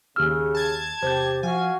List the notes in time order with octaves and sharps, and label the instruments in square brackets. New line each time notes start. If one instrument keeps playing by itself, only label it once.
[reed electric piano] D#2 E6 [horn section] C#3 [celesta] G4 F6
[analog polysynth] A5 G#6
[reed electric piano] E2 C3 G6 [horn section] G4 [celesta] C5
[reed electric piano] F3 [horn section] F#4 F5 [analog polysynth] G#5